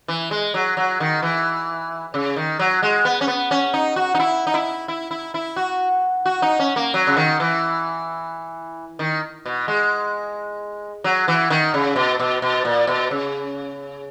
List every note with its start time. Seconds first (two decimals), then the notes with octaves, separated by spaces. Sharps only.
0.08 E3
0.31 G#3
0.54 F#3
0.77 F#3
1.00 D#3
1.23 E3
2.14 C#3
2.36 D#3
2.59 F#3
2.83 G#3
3.05 B3
3.21 C#4
3.28 B3
3.51 C#4
3.74 D#4
3.96 F#4
4.15 D#4
4.20 E4
4.47 D#4
4.54 E4
4.88 E4
5.11 E4
5.34 E4
5.56 F#4
6.26 F#4
6.42 D#4
6.59 C#4
6.76 A#3
6.94 F#3
7.07 C#3
7.17 D#3
7.40 E3
8.99 D#3
9.45 B2
9.68 G#3
11.04 F#3
11.28 E3
11.50 D#3
11.74 C#3
11.96 B2
12.19 B2
12.42 B2
12.65 A#2
12.87 B2
13.11 C#3